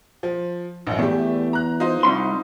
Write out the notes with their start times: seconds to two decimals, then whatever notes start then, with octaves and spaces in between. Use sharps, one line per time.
0.23 F3
0.87 A1 F#2
0.99 E2 A3 G4
1.53 A#5 F#6
1.80 D#4 F4 C5
2.03 C2 F#2 C6